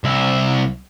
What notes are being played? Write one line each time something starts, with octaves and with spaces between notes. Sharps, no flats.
C2 E4